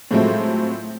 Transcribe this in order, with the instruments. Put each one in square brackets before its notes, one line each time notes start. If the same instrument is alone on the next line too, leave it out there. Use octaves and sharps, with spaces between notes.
[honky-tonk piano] A2 F3 F#3 G#3 A3 C4